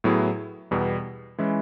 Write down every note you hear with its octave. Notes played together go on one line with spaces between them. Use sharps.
A2 F#3 B3 E4 G#4
E2 B2 G3 B3
E3 G#3 C#4 E4